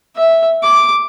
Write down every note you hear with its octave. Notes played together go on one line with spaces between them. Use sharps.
E5
D6